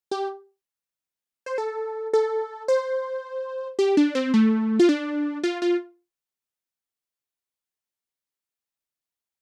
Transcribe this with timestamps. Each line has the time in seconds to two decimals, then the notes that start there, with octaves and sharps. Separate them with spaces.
0.11 G4
1.46 C5
1.58 A4
2.13 A4
2.68 C5
3.79 G4
3.97 D4
4.15 C4
4.34 A3
4.80 F4
4.89 D4
5.43 F4
5.62 F4